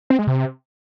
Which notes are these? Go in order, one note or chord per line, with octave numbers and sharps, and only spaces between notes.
C4
G#3
C3